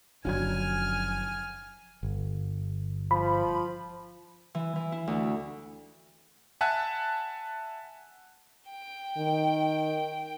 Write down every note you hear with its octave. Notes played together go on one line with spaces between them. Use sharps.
F#1 D3 F3 F#3 G#5 F6 G#6
G1
F3 B5
E3
E3
E4
D2
E5 F#5 G#5 A5 F#6
G5
D#3